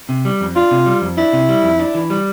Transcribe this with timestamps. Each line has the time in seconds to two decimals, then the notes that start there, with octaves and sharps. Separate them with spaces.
0.09 C3
0.25 G3
0.41 F2
0.56 D4 F4
0.71 C3
0.86 G3
1.02 F2
1.17 D4 E4
1.33 C3
1.49 G3
1.63 F2
1.80 D4
1.95 E3
2.10 G3